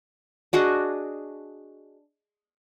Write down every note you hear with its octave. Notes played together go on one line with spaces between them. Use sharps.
D4 F#4 G#4 D#5